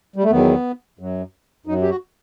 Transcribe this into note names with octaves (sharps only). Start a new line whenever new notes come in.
G3
A3
E2 D#3 F#3 B3
F#2 F#3
F#2 F#3 D#4
G4
F#4